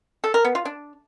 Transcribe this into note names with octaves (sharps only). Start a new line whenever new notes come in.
A4
A#4
B3
F4
D4